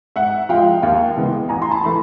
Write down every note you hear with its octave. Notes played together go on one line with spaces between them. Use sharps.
G#2 E5 F#5
F3 G#3 F5 G5
D#2 F5 G5
C#3 E3 G#3 B3
A1 G#5 A#5
C6
A5 B5
E3 A3 B5